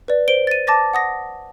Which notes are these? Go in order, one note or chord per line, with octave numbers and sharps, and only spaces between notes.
B4 D5
C5 D7 G7
A6 D#7
A5 D6 A6 A#6
F#5 D#6 A#6